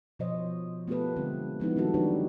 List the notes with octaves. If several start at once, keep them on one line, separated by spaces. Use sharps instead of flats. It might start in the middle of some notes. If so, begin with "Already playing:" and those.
B2 F3 C5 C#5 D#5
A3 B3 F4 G4 A4 B4
D3 G3 G#3 C4
F3 G#3 B3 C4 D#4 E4
D#3 G3 C4 D#4 F#4 A4
F#3 D4 D#4 G4 B4 C#5